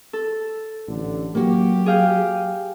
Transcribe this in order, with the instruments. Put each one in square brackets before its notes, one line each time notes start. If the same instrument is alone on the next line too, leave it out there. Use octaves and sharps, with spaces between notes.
[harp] A4
[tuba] A1 [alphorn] D3
[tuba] F#3 [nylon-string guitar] A#3 F#4 [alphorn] G4
[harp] G#4 F5 G5